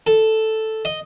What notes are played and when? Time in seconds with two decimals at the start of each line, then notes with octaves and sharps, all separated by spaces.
0.07 A4
0.85 D#5